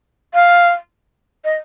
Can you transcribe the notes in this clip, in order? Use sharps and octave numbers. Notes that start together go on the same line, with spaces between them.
F5
D#5